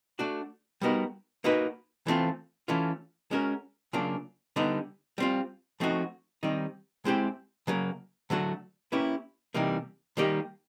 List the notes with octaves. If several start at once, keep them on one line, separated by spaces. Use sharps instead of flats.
A3 D4 F#4
G3 B3 D#4 F#4 A#4
A#3 D#4 F#4 B4
E3 A3 C4 F4
E3 A3 C#4 F4
G#3 C#4 F#4 A#4
C#3 F#3 A#3 D4 F4
D3 G3 B3 D#4
G3 C4 F4
F3 A3 C4 D#4 F#4
D#3 G3 C4 D#4
G#3 C4 E4 G4 C5
C#3 F#3 A#3
D3 F#3 A3 D4 F#4
A#3 C#4 E4 G4 B4
C3 E3 G3 A#3 D#4
D#3 G3 A#3 D#4 G4